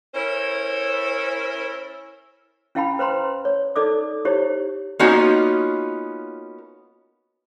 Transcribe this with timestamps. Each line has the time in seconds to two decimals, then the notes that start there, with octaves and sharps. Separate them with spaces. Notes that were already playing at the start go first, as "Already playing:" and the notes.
0.14 C#4 E4 A4 A#4 C5 C#5
2.75 C#4 E4 F5 G5 A5 B5
2.99 B4 C5 A#5 C6
3.45 C#5
3.76 D#4 A4 D5 D6 D#6
4.25 D#4 E4 G4 C5 C#5
4.99 A#3 B3 C#4 D#4 F4 F#4